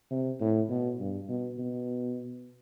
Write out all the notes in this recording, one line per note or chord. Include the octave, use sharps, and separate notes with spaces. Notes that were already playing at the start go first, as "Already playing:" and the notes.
C3
A2
B2
G2
B2
B2